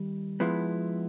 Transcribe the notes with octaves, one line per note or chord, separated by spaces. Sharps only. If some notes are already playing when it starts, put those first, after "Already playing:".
Already playing: D#3 G3
F3 G#3 B3 E4